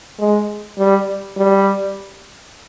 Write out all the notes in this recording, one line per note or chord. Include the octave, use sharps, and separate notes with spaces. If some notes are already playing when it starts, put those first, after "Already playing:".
G#3
G3
G3